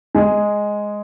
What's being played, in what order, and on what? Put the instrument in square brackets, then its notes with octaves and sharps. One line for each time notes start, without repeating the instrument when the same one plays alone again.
[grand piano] G#3